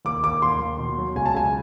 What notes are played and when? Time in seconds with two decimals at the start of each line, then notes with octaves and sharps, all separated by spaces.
0.05 D#2 D6
0.23 D#2 D6
0.42 D#2 C6
0.61 D#2
0.79 B2
0.98 F#3
1.16 C#2 G#5
1.26 A5
1.34 C#2 G#5